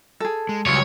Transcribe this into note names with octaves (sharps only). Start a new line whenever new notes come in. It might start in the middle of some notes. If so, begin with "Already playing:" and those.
G#4 A4
G#3
C#2 F#3 G3 C#5